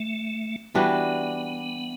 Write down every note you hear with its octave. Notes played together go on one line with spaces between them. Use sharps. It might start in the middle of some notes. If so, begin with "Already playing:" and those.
Already playing: A3
E3 G3 B3 D4 F#4